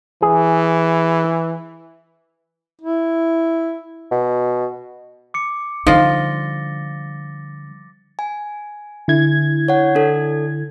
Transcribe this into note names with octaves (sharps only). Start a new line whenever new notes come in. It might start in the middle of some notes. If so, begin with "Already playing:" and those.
E3 G#4
E4
B2
D6 C#7
D3 F3 G3 D#4 A6 A#6 G7
G#5
D3 E4 G#6
C#5 F#5
D4 A4